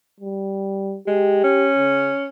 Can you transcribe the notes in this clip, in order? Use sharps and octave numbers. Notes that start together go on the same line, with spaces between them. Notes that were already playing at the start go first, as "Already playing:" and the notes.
G3
G#3 G4
C#4
C#3